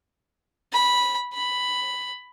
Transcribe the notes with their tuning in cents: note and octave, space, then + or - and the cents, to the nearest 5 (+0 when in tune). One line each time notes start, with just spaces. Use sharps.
B5 -10
B5 +5